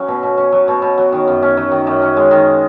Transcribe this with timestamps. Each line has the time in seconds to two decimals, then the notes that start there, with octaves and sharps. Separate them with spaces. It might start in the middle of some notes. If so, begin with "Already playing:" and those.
Already playing: F#3 C#4
0.08 B2
0.23 B2
0.38 C#4
0.52 F#3
0.68 B2
0.82 B2
0.98 F#3
1.12 D#3
1.28 F#2
1.42 C#4
1.57 F#3
1.72 D#3
1.87 F#2
2.02 C#4
2.17 G#3
2.31 D#3